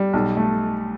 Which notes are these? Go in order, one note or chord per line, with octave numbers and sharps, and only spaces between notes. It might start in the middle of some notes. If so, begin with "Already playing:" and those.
Already playing: G3
B1
A3